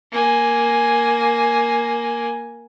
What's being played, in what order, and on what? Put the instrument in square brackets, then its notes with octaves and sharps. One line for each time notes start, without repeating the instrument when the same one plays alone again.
[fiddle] A#3 G#5